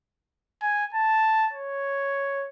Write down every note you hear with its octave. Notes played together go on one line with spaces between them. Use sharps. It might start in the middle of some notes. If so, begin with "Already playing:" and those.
G#5
A5
C#5